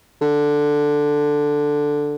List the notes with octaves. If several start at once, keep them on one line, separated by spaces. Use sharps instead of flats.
D3